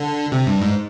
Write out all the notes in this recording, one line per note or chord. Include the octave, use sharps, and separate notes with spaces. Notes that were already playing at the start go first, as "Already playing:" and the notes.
Already playing: D3
C3
G2
G#2